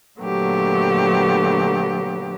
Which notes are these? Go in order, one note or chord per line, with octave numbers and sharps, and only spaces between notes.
A#2 D3 F#3 A3 B3 G4